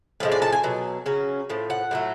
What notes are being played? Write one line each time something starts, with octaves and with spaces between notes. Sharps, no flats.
A2 F3 G#3
D5
A5
G#5
B2 F#3
C#3 F#3 C#4
A2 F3
F#5
A2 F#3 A3